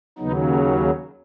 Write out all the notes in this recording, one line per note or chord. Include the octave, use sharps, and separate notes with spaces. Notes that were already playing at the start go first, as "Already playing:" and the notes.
D#2 C#3 F#3 B3 D#4